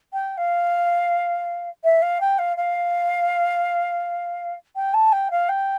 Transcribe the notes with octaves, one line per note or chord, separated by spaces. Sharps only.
G5
F5
E5
F5
G5
F5
F5
G5
A5
G5
F5
G5